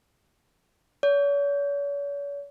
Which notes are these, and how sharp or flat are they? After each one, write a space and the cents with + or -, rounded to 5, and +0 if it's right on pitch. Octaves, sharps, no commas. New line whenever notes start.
C#5 +40